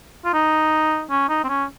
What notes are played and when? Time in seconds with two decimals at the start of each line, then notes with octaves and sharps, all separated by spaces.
0.25 F4
0.33 D#4
1.10 C#4
1.29 D#4
1.44 C4
1.49 C#4